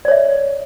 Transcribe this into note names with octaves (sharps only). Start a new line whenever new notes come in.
C#5 D5 E5